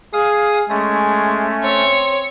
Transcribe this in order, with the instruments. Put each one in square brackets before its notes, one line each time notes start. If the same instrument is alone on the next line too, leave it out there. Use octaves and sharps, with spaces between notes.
[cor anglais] G#4 [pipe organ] F5 D#6
[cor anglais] G#3 [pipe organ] A3 C#4
[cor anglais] C4 [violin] C#5